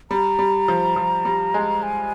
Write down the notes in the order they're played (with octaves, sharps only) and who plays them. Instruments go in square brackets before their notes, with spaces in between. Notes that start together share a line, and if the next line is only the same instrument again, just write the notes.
[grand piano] G3 [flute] A#5
[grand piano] G3
F3
F3
G3
G#3
[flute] G#5